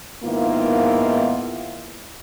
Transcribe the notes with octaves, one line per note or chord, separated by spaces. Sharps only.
G#2 D#3 A#3 B3 E4 F4